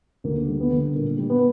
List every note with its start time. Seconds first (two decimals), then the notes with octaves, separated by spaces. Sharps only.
0.24 D2 A#3
0.48 G3
0.60 B3
0.72 D3
0.95 A#2 A#3
1.18 G3
1.30 B3